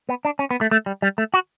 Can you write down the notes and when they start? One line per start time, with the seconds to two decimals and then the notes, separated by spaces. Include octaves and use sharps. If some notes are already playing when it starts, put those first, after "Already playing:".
0.09 B3
0.25 D4
0.39 C#4
0.51 B3
0.61 A3
0.71 A3
0.86 G3
1.02 G3
1.18 A3
1.34 F#4